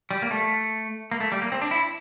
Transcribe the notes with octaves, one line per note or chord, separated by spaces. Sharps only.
G3
A#3
A3
A#3
A3
G3
A#3
C4
D4
E4